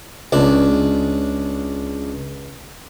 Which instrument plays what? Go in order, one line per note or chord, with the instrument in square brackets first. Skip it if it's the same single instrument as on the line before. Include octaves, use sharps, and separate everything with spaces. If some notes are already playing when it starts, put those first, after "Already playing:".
[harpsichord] C#2 D4